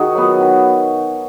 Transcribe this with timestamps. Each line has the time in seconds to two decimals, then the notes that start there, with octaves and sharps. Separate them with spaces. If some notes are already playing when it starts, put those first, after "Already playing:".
Already playing: D#3 D#4 F#4 G#4
0.15 F#3 B3
0.40 D#3